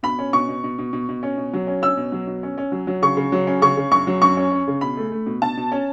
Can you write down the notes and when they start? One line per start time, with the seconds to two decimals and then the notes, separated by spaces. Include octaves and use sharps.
0.03 B2 B5
0.19 C#4
0.33 B2 C#6
0.49 B2
0.64 B2
0.78 B2
0.93 B2
1.09 B2
1.23 C#4
1.37 B2
1.53 F#3
1.67 C#4
1.82 C#4 E6
1.97 B2
2.12 F#3
2.27 B2
2.43 C#4
2.58 C#4
2.72 F#3
2.87 F#3
3.02 C#3 C#6
3.17 C#3
3.32 F#3
3.47 C#4
3.62 C#3 C#6
3.77 C#3
3.91 F#2 C#6
4.07 F#3
4.22 F#2 C#6
4.37 C#4
4.52 C#4
4.67 C#3
4.81 B2 B5
4.97 A3
5.12 A3
5.26 B2
5.42 B2 A5
5.57 B2
5.72 C#4